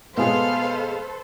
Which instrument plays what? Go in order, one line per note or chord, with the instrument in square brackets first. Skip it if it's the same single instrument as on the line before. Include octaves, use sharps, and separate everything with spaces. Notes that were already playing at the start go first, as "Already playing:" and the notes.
[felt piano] B2 G#3 [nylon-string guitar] B3 G#4 [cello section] A4 B4 C5 [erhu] F5